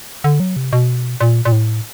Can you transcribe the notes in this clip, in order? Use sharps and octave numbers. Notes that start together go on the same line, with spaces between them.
D3
F#3
C3
B2
A#2
A#2
A2